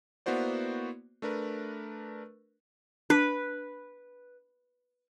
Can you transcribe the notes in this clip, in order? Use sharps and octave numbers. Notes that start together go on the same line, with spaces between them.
A#3 B3 E4 F#4 C5 D5
A3 D4 A#4 B4
D4 B4